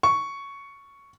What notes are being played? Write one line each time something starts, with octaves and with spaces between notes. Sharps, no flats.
C#6